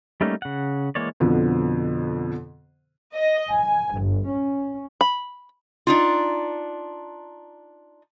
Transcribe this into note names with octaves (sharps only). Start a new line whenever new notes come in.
G3 A3 A#3 C#4 D#4
C#3 F#5
E3 G#3 A#3 C#5 D5
F2 B2 D3 F3
D#5
G#5
G1
C#4
B5
D4 D#4 F4